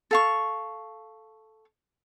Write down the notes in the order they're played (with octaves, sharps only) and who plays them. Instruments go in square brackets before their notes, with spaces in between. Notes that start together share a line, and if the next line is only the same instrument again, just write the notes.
[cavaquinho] A4 F5 C#6